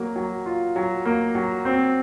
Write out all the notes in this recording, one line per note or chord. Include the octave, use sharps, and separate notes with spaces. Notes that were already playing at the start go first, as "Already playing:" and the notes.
Already playing: F#3 A#3
F#3
F4
F#3
A#3
F#3
C4